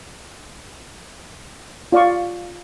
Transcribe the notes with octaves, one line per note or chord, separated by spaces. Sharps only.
F4 D5 F5 C#6